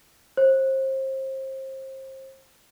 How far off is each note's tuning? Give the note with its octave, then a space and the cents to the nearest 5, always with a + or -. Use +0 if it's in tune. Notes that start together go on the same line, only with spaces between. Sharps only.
C5 +30